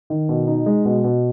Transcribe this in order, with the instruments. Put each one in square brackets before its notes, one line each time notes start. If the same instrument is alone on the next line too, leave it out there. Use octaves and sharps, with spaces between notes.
[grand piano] D#3
B2
D#4
G#3
B2
B2